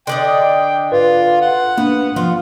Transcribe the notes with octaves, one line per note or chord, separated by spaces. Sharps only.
D3 D5 D#5 G5
F4 B4
F#5
A#3 B3 D4
F3 F4